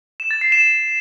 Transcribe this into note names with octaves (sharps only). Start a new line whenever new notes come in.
E7
A6
C7
E7